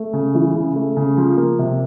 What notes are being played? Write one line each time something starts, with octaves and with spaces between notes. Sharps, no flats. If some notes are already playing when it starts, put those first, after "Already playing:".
Already playing: A3
C#3
E3
C#3
A3
C#3
F3
A#3
C3